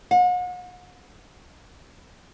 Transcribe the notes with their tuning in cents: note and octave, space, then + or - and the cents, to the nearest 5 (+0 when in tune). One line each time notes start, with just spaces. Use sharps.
F#5 -40